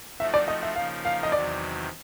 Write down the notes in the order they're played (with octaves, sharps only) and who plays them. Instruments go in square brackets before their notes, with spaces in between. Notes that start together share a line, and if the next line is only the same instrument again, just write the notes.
[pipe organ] F3 A3 C4 D#4 F#4 [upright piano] E5
[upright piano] D5
D#5
E5
[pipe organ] C#3 F3 A#3 D#4 [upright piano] F5
[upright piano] F5
D#5
[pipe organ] E2 C3 D#3 F#3 [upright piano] D5